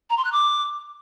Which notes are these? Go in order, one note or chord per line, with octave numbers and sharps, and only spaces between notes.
A#5
C6
F#6
D6